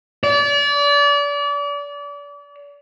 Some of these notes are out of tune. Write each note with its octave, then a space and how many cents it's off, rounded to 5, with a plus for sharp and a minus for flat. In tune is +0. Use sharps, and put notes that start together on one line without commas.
D5 -35